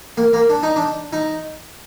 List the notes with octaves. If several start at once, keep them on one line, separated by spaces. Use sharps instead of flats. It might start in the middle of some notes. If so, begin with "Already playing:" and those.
A#3
A#3
D4
D#4
D4
D#4